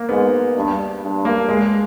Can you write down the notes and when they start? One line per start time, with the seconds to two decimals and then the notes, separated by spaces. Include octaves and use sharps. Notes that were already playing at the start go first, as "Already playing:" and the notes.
Already playing: A#3
0.09 G#2 B3
0.56 G2
1.03 G2
1.25 A#3
1.49 G#3